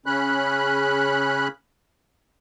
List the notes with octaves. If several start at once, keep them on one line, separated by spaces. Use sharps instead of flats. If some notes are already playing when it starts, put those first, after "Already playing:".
C#3 C#4 B5 F#6